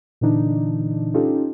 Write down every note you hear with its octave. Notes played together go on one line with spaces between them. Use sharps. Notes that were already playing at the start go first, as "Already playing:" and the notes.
A#2 D3 E3 D4 D#4
C#4 D#4 F4 G4 A4